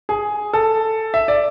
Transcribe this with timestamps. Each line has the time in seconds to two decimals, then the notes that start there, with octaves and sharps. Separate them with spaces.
0.09 G#4
0.53 A4
1.14 E5
1.28 D5